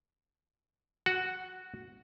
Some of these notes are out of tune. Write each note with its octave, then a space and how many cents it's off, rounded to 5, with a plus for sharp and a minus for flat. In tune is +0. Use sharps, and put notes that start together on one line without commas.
F#4 +0 F#5 +15